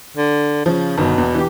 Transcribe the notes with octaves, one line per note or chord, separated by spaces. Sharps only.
D3
C#3 F3
G1 B2 D#3
E2
E3 G4